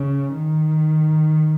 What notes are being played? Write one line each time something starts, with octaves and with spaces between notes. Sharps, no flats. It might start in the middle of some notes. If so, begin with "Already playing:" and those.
Already playing: C#3
D#3